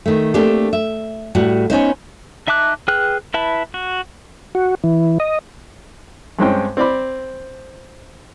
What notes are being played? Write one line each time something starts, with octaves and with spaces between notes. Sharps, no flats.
D#3 A3
A3 A#3 C4 D4 G4
E5
A2 G3 F#4
B3 C#4 D#4 C5
D#4 E5 A5 D6 F#6
G#4 B4 G5 F6 F#6
E4 B4 E5 A5 B5
F#4
F#4
E3
D#5
G2 G#3 C4 C#4 G5
C4 D5 B5